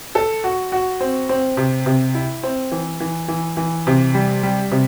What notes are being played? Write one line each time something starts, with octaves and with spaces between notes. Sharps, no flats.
A4
F#4
F#4
C4
C4
C3
C3
E4
C4
E3
E3
E3
E3
C3
G3
G3
C3